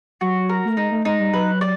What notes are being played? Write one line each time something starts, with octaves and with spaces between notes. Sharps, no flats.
F#3 F#4
A#4
A3
G#3 D#4
A3
G#3 D#4
G3
F#3 B4
D5